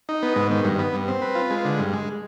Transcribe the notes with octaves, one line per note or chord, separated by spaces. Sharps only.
D#4
B3
G#2
D#3
G2
B3
G2
C4
B4
F4
G#3
D3
G2
G#3